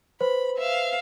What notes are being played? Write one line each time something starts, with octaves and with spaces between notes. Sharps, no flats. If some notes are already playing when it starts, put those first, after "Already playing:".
B4 C5 B5
E5 F5